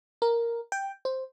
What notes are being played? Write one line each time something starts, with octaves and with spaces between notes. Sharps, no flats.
A#4
G5
C5